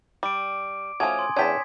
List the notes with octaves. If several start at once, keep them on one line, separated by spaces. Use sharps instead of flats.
G3 D6 D7
F3 A3 C#4 F#4 G#5 D#6 G#6
C6
E2 C#4 D4 G5 A5 G#6 B6